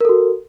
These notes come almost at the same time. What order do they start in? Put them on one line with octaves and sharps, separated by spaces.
A#4 A4 F#4